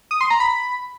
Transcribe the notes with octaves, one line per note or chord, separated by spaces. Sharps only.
D#6
C6
A#5
B5